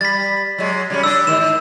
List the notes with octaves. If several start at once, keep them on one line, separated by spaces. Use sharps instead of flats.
G3 A6 B6
F#3 G#3
C#3 G3 C#4
D4 G4 E6
G#2 D#3 E7